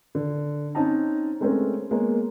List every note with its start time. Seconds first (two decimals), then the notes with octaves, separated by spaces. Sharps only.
0.15 D3
0.75 C4 C#4 D#4 A5 A#5
1.41 G#3 A3 C4 C#4 A#4 B4
1.91 G#3 A#3 B3 C#5